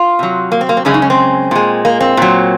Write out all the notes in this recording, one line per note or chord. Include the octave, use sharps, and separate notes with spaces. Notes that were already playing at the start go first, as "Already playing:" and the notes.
Already playing: F4
C3 F#3
A#3
C4
A#3
C4
F#2 C#3 G#3 C#4
D#4
C#4
C4
A#2 G#3
A#3
C4
A#2 F#3